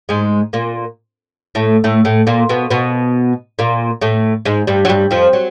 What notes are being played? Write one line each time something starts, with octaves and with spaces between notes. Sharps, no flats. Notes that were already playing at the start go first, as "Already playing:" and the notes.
G#2 G#3
A#2 A#3
A2 A3
A2 A3
A2 A3
A#2 A#3
B2 B3
B2 B3
A#2 A#3
A2 A3
G#2 G#3
G2 G3
F#3
G2 G3
F2 F3
F#3